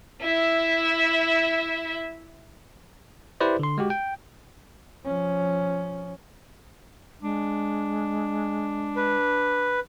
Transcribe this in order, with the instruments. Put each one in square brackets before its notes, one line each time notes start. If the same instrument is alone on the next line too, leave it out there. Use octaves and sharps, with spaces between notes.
[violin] E4 E5
[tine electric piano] E4 G4 B4 C5 D5
D3 C6
G#3 F#4 G4
G5
[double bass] F3 C#4
[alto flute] G#3 [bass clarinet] D4
[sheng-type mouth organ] B4